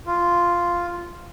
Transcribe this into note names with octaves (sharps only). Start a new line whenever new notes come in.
F4